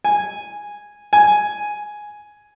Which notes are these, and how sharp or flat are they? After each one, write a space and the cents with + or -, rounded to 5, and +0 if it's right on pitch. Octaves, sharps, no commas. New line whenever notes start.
G#5 -5
G#5 +5